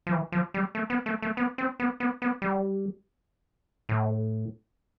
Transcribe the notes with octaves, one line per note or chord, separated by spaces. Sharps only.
F3
E3
F3
G3
A3
B3
A3
A3
B3
C4
B3
B3
B3
G3
A2